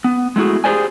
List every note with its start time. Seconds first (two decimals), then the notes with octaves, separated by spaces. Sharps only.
0.04 B3
0.36 G#3 A3 E4 F#4 G#4
0.64 G4 G#4 B4 C5 D5 G#5